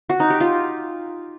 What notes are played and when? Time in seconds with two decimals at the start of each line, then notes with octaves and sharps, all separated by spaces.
0.09 F#4
0.20 D#4
0.30 G4
0.40 F4